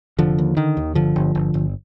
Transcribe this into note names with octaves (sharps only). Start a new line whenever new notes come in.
F1 D3 F3
D#2
D3 D#3
D#2
G1 D3 F3
G1
G1
G1